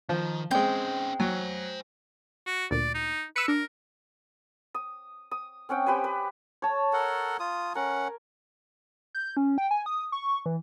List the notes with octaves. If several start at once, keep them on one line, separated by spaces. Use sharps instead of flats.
D#3 F3
G#3 C4 C#4 C5 G5 G6
F#3 C5 G#5
F#4
D2 A#2 D5
D#4
B4 E6 C#7
D4 A#4
D#6
D#6
C4 C#4 F#5 G5
G4 B4 C5 G#5
B4
C#5 A5
A4 A#4 F#5
F4 D#6
C#4 A#4 F#5
G6
C#4
G5
G#5
D#6
C#6
E3